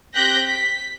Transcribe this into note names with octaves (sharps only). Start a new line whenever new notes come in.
C4 G4 F#6 G6 A#6 B6
B6